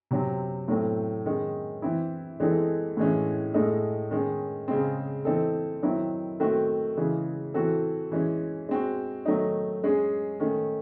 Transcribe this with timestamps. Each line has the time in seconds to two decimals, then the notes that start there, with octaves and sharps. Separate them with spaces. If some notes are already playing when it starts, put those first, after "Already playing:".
0.11 C3 F#3 C4
0.68 A2 F#3 A3 C4
1.26 D#3 G#3 C#4
1.82 E3 C4 E4
2.40 E3 G#3 C4 D#4 A4
2.97 A2 E3 G#3 C#4
3.54 A2 G#3 D#4 A4
4.11 D#3 G#3 C#4
4.68 C#3 G#3 C4
5.25 E3 C4 D#4 A4
5.83 D#3 F#3 C4 E4
6.40 D#3 A3 C4 F#4
6.97 C#3 E3 G#3
7.54 E3 C4 F#4 A4
8.11 E3 G#3 C#4
8.69 G#3 C4 F#4
9.25 D#3 F#3 A3 D#4
9.84 G#3 C#4 G#4
10.40 D#3 A3 C#4